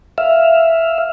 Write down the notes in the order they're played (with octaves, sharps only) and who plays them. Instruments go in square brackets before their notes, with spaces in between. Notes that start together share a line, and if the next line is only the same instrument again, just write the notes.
[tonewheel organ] E5 F5